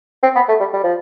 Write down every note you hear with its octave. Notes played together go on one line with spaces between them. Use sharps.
C4
B3
A3
G3
G3
F3